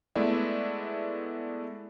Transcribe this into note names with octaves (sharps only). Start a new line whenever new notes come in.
G#3 A3 B3 E4 D5 E5